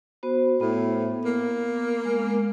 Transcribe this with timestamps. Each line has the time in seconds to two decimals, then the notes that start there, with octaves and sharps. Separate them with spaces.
0.23 B3 F#4 C5
0.61 A2 B3
1.25 A#3
2.05 G#3